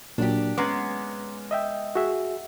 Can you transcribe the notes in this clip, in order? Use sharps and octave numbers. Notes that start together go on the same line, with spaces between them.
A#2 F#3 D4 G4
G#3 B3 C#4 A#5 C6 D6
D#5 E5 G5
F#4 G#4 E5